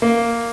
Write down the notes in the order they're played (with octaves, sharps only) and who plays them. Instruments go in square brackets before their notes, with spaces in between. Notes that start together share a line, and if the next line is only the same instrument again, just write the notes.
[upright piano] A#3